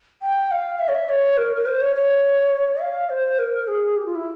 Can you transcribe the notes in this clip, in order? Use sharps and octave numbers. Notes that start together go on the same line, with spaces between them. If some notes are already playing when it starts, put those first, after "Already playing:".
G5
F5
E5
C#5
E5
C#5
A#4
A#4
C5
C#5
C#5
F5
C5
A#4
G#4
G4
F4
E4